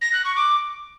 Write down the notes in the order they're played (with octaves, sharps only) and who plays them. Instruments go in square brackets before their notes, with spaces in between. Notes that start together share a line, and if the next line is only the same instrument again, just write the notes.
[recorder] A#6
F#6
C#6
D6